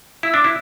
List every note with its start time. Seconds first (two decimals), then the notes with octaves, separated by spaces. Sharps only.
0.23 E4 E6
0.34 D4 D6
0.44 E4